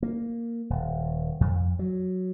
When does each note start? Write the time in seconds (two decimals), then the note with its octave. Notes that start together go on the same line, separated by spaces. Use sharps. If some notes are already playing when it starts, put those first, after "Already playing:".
0.03 A#3
0.70 D#1
1.41 F2
1.79 F#3